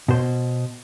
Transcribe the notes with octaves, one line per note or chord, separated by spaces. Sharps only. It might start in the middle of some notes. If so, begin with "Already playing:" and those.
B2 C5